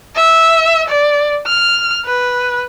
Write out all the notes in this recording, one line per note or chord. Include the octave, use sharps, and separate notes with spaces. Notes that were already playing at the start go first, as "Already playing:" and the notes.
E5
D5
F6
B4